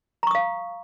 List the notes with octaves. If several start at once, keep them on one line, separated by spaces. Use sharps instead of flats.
F5 A#5 C#6 D#6